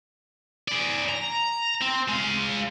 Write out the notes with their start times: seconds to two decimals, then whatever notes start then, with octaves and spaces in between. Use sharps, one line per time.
0.68 G#4 D5
1.09 A#5
1.82 C4
2.09 G#3 F5